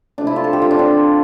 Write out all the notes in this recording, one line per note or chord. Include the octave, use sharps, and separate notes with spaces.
C3 F3 A3 D4
E4
F4
A4
G4
F4
D4
C4